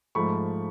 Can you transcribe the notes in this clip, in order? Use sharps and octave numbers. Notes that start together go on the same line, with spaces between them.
G#2 F3 A3 B5 C#6